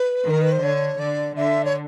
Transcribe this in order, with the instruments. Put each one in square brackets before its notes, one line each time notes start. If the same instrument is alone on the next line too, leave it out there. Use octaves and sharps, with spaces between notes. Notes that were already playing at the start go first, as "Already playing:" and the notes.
Already playing: [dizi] B4
[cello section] D#3 [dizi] A#4
[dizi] B4
C5
[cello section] D3 [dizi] C#5
[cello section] D3 [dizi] D5
[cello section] D3 [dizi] E5
[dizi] C#5